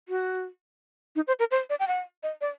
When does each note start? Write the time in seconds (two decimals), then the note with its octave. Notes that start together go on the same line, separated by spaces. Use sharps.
0.09 F#4
1.16 D#4
1.27 C5
1.39 A#4
1.51 C5
1.70 D5
1.80 G5
1.88 F#5
2.23 D#5
2.41 D5